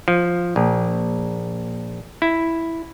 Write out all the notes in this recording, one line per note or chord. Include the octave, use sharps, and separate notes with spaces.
F3
A#1
E4